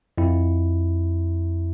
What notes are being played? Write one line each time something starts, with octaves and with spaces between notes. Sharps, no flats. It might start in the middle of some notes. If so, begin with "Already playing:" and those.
F2 E4